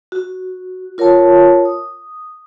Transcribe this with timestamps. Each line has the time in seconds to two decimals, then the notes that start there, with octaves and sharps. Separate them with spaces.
0.12 F#4
0.98 F4 A#4 C#5 F#5 A5
1.65 D#6